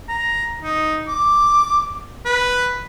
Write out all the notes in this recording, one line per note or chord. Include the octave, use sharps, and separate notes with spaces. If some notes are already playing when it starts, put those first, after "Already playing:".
A#5
D#4
D6
B4